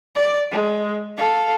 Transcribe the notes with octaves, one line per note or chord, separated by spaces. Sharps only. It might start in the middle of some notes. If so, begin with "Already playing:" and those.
D5
G#3
A4 F5